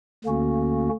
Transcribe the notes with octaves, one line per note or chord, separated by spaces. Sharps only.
D2 D3 A#3 C#4 F#4